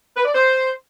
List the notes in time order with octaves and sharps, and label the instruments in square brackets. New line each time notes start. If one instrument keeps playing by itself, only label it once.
[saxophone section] B4
D5
C5